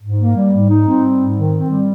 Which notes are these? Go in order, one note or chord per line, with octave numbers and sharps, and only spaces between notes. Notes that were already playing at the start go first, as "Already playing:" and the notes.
G#2
A#3
G3
G#2
D#4
C4
G3
G#2
D#3
C4
G3